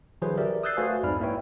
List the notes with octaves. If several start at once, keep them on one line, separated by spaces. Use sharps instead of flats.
D3 E3 F#3 G#4 B4 C5
G4 A#4 D5 E5
D#6 E6 F#6 G6 A6 C7
A3 F#4 B4 C5 F5 G#5
C2 F2 G#2 D5 B5 F6
A#3 E4 B4 C#5 G5